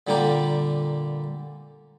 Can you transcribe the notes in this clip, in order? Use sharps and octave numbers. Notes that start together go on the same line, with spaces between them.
A#2 D3 G3 A#3 G4 A#4